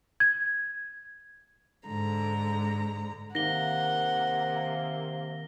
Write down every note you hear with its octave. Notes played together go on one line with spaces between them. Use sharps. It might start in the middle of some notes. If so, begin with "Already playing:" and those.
G#6
G#2 D3 A#5
C3 D#3 A#3 F#5 A#6 G7